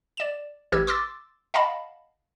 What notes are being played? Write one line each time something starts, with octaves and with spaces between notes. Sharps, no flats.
D5 E7
A1 G4 B4 E6 G#6
C6 D6 E6 A6
D#5 F5 F#5 A5 B5